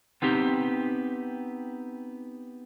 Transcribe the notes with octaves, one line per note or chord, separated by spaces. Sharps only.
B3 C4 D#4 G4